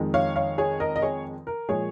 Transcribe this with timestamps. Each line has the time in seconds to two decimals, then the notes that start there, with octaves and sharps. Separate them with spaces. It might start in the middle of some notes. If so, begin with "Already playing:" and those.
Already playing: F2 D#3 G#3
0.14 C#5 F5
0.36 C#5 F5
0.58 G#4 C#5
0.80 A#4 D#5
0.96 D#5
1.02 G#4 C#5
1.47 A#4
1.69 A#2 F3 G#3 G#4 C#5